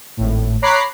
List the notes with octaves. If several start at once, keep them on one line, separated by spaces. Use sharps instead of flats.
G#1 A2
C#5 A#5 B5 D6 F#6 C7